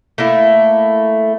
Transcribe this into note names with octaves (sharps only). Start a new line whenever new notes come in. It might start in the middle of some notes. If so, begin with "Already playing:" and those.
A3 A#3 E4